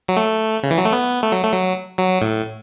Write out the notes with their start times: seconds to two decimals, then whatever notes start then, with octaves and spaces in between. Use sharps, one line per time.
0.08 F#3
0.17 A3
0.63 C#3
0.71 E3
0.78 F#3
0.85 A3
0.92 B3
1.23 A3
1.32 F#3
1.43 A3
1.53 F#3
1.98 F#3
2.22 A2